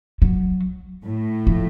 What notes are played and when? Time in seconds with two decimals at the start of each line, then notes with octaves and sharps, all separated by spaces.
0.22 F#3
1.06 A2
1.47 F3